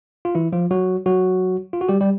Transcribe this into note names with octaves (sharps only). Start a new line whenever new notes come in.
F4
E3 E4
F3 F4
F#3 F#4
F#3 F#4
F4
F#4
G3 G4
G3 G4